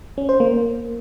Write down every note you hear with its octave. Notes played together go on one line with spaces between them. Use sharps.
C#4
C5
A#3